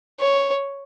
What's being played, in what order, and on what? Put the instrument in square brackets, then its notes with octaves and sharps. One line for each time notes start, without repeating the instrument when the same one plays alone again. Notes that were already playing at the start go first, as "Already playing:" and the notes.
[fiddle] C#5